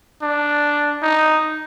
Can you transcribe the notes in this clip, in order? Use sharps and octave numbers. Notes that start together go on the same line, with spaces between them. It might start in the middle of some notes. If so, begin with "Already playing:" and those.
D4
D#4